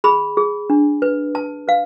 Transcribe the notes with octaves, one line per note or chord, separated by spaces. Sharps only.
G#4 B5
G#4
D4
B4
B4 A5
B4 F5